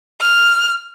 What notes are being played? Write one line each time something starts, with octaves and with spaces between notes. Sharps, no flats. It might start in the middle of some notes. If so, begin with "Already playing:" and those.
F6